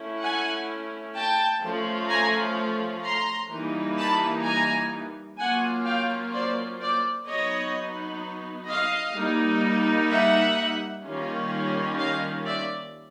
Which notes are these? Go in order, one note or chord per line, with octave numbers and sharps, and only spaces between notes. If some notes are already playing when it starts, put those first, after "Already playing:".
Already playing: A3 C#4 E4
F#5 G#5
G5 A5
F3 A3 C#4 F4
G#5 A#5
A#5 C6
E3 G3 A#3 D#4
A5 B5
G#5 A#5
F#3 A#3 C#4 F4 F#5 G#5
F5 G5
C5 D5
C5 D5
F#3 B3 D#4 C#5 D#5
D#5 F5
G3 A#3 D#4
E5 F#5
D#3 G3 A#3 C#4 F4
D#5 F5
D5 E5